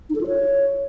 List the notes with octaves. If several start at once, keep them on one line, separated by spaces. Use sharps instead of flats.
D#4
A4
F4
C#5